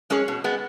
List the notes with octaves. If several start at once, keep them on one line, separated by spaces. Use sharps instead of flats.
G#3 C#4 G#4 C#5
B2
G#3 B3